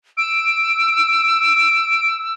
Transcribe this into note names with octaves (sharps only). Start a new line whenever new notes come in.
E6 D7